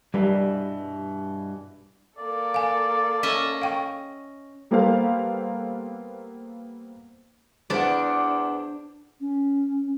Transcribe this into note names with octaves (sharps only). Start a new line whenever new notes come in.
G2 B2 E3 G3
A#3 A4 D5
F5 G#5
C#4 D#5 E5
F5 G5 C#6
G3 A#3 B3 A4 C5 F5
E2 D4 B4 C5 D5 F#5
C#4